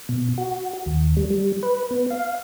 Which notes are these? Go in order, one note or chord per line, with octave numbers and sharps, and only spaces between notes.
B2
F#4
D#2
G3
G3
B4
B3
F5